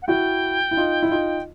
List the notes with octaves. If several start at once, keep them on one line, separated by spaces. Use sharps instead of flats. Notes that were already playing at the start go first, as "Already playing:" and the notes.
F#5
E4 F#4 G5
E4
D#4 F4
E4
D#4 F4